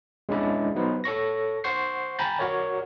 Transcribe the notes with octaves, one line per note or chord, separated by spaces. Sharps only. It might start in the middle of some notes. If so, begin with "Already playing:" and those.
G#3 C#4 D4 E4 D5 E5
F#3 B3 D#4 F#4 B4 C5
A4 C#5 C#6 A#6
C5 F#5 C6 C#6 G6 C7
G5 G#5 A#5 B5 G6 A6
F#4 A#4 C#5 D5